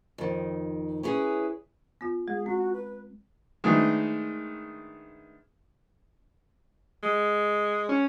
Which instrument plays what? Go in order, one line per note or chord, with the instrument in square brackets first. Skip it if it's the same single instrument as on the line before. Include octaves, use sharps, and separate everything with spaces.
[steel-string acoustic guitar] F2 D#3
C#4 E4 G#4 B4
[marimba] B3 F4
[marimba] G#3 [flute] G#4
[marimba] C4 [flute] F#4
[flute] B4
[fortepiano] D#3 G#3 A3 B3 D4
[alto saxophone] G#3
[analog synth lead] C#4